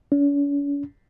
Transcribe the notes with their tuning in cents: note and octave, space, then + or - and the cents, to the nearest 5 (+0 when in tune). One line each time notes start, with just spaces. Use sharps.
C#4 +45